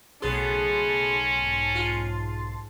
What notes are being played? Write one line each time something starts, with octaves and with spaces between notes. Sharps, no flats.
B1 C#3 A3 B3 C#4 G#4 A5 C6
G#2
F4